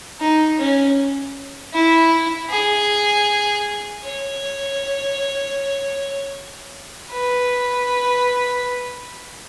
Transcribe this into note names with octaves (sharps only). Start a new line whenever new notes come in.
D#4
C#4
E4
G#4
C#5
B4